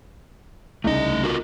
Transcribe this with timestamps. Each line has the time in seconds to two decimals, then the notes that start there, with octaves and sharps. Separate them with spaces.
0.84 C2 C#3 A3 D#4 D#5
1.23 F4 F#4 A#4